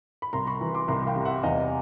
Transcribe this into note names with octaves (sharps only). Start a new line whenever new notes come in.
B5
C2 A#5 C6
B5 C#6
E3
C6 D6
C2 A#5 C6
F5 G5
C3
E5 F#5
E2 D#5 F5